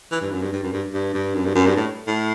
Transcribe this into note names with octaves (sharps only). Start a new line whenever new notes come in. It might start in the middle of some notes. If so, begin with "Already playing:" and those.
E3
G2
F#2
G2
G2
F#2
G2
G2
G2
F#2
G2
F#2
G2
A2
A2